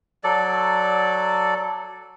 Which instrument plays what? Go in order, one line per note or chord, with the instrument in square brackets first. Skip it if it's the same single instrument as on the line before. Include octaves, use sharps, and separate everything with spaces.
[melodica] F#3 A4 D5